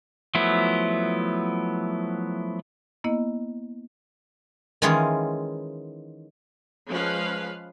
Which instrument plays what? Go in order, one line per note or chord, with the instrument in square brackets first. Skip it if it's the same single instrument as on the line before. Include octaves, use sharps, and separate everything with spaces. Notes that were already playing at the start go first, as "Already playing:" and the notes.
[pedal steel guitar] F3 F#3 A3 B3 E4
[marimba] A#3 B3 E4 D#5
[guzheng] D#3 E3 G#3 C#4 F4 G#4
[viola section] F3 G#3 C#4 B4 F5